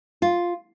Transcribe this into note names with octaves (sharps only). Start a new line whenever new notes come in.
F4